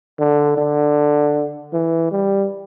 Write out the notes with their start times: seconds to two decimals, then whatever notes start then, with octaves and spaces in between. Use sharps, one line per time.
0.20 D3
0.58 D3
1.73 E3
2.12 G3